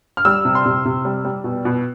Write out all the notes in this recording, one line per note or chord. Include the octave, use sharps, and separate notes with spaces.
F6
G3 E6
C3
C6
C3
C3
G3
G3
B2
B2